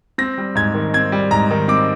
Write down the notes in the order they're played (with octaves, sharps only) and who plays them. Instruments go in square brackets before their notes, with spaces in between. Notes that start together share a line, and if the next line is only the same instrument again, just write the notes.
[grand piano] C4 A#6
G3
G#2 G#6
D#3
C4 G#6
G3
G#2 A#5
D#3
C4 D6